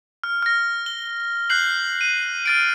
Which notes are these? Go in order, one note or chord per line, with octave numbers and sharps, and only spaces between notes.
F6
F6 A#6
G7
F#6 G6 C7 F#7
D#7
F6 A6 D7